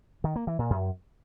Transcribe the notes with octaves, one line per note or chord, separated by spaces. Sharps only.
D#3
A#3
E3
A#2
F#2